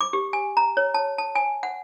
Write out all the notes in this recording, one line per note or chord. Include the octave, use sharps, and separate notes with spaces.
D6
G4
G#5
A#5
C#5
A5
A5
G#5
F#5